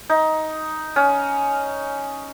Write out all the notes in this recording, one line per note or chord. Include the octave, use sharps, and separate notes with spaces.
D#4
C#4